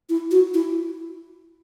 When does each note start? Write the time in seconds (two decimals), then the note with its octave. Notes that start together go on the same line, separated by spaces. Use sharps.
0.09 E4
0.31 F#4
0.54 E4